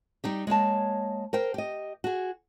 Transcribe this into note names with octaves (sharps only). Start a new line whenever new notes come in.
G3 D#4 G4
G#3 A#3 C#5 A5
A#4 C5 G5
G4 D#5
F#4 G#4